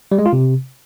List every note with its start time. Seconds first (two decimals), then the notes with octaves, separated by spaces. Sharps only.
0.12 G3
0.19 G#3
0.26 F4
0.33 C3